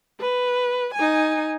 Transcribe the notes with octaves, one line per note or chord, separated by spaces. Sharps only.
B4
D#4 G#5